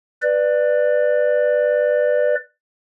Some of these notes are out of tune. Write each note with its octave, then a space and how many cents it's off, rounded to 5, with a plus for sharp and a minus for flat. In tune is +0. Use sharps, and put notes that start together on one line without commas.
B4 +0 D5 +15